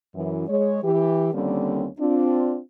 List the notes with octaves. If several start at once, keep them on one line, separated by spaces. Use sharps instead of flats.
F#2 E3
G#3 C#5
E3 G4
D#2 D3 G3 A#3 C4 C#4
C4 D4 F4